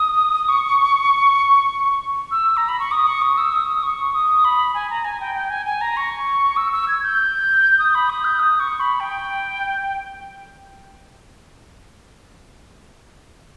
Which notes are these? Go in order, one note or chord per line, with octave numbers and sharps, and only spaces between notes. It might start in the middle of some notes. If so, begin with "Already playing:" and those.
Already playing: D#6
C#6
E6
A#5
B5
C#6
D#6
C#6
D#6
E6
D#6
C#6
D#6
B5
G#5
A#5
G#5
G5
G5
G#5
G#5
A#5
C#6
E6
E6
G#6
G6
D#6
B5
D#6
G6
D#6
C#6
B5
G5